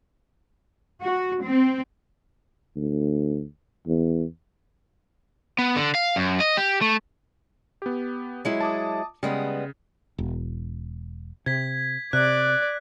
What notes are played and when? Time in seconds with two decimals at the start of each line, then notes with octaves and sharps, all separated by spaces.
1.02 F#4
1.45 C4
2.76 D2
3.87 E2
5.59 B3
5.76 D3
5.95 F5
6.16 F#2
6.40 D#5
6.57 G4
6.81 A3
7.82 B3 G4
8.45 F#3 G#3 E4
8.61 A5 D6 D#6
9.23 C#3 G3 G#3 B3
10.18 E1
11.46 C3 G#6 B6
12.13 C3 D5 F#6